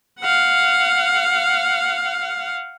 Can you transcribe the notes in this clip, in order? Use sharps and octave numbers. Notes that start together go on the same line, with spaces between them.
F5 F#5